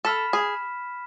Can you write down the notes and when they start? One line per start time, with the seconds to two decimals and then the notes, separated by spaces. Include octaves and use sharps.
0.05 A4 B5 F6 B6 E7
0.33 G#4